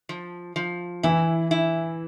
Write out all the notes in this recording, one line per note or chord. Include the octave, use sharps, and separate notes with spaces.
F3
F3
E3 E4
E4